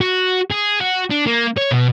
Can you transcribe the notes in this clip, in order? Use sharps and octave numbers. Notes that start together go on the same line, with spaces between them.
F#4
G#4
F#4
D4
A#3
C#5
B2